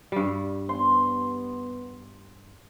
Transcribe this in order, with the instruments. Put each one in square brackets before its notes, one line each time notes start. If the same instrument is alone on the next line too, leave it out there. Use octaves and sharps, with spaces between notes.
[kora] G2 G3
[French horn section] B3 [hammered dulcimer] C6